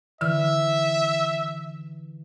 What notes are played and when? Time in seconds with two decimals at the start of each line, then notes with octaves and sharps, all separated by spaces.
0.21 D3 E3 E5 E6 F6